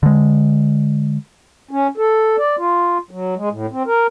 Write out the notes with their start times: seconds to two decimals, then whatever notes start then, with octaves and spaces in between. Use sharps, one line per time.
0.03 D3 G#3
1.71 C#4
1.98 A4
2.38 D5
2.59 F4
3.11 F#3
3.36 G#3
3.51 A2
3.72 C4
3.87 A#4